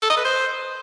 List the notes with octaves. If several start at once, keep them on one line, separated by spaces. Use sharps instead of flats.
A4
D#5
B4
C5